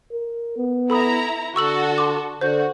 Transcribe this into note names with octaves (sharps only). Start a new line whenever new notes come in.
A#4
B3
E4 A4 A#5 B5 D#6
D3 F#4 A4 C#6 E6 F#7
C6 D6
D3 F#4 C5 G6